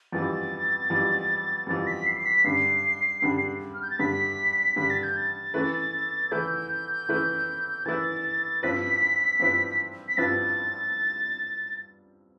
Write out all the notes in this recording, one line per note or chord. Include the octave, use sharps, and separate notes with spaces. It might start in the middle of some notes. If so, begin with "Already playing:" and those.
F2 E3 G3 A6
F2 E3 G3
F2 E3 G3 A6
B6
C7
C7
B6
G2 D3 G3 C7
G2 D3 G3
F6
G6
A6
G2 D3 G3 B6
G2 D3 G3 B6
A6
G6
A6
E3 A3 E4 B4
E3 A3 E4 B4 G6
E3 A3 E4 B4
E3 A3 E4 B4 A6
G2 F3 C4 E4 B4 B6
G2 F3 C4 E4 B4
B6
G2 F3 C4 E4 B4 A6